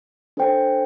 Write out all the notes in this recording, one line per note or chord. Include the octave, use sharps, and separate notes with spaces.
D4 A4 C5 G5